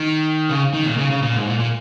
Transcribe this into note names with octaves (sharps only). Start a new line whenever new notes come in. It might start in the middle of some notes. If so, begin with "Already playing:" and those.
Already playing: D#3
C#3
D#3
A#2
C#3
C#3
A#2
G#2
A#2
A#2